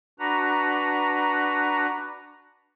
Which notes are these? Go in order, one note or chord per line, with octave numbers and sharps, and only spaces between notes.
D4 F#4 B4 A#5